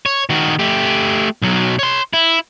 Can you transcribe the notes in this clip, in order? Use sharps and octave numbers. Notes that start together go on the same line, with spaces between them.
C#5
D#3 F#4
A3 G4
B1 F#3
C#5 C6
E4